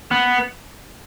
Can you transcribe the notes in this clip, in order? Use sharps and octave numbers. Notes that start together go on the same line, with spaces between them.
B3